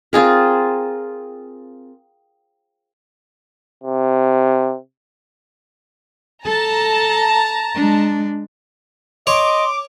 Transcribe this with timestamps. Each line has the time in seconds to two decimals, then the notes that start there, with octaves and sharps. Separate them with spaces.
0.13 C4 F4 G#4 A#4
3.84 C3
6.45 A4 A5 A#5
7.75 G#3 D4
9.27 C#5 D#5 C6 D6